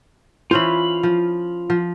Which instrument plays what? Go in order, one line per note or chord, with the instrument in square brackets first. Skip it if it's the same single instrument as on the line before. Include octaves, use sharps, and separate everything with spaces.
[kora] E3 C#4 C5 [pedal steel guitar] F4 B5
[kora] F3
F3